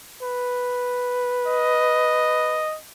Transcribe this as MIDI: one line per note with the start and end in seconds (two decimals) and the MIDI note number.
0.22 2.67 71
1.48 2.77 75